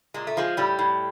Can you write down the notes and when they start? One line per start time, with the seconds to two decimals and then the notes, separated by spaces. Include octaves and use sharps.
0.14 A#2 G#3
0.27 A3
0.37 F3 G#3
0.57 A2 G3
0.79 A2